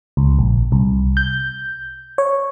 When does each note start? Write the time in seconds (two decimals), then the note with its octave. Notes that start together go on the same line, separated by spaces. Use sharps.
0.17 C#2
0.39 A#1
0.72 C2
1.17 G6
2.18 C#5